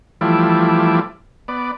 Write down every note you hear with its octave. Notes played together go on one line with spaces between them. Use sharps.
E3 F3 G3 A3 E4 D5
B3 D5